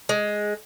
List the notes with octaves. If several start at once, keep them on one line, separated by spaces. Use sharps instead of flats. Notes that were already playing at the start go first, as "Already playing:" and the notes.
G#3